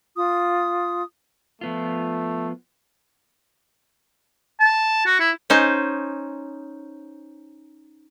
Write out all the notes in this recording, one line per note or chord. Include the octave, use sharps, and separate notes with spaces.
F4 D#6
F3 A3 B3 F4
A5
F#4
E4
C#4 D#4 C5